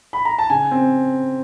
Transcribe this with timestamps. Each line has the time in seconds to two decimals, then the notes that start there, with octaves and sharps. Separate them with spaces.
0.13 B5
0.25 A#5
0.38 A5
0.50 C#3 G#5
0.71 C4